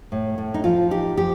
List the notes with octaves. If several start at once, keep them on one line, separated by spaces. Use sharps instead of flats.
A2
A2
D#4
F3 F4
D#4 G4
F3 G4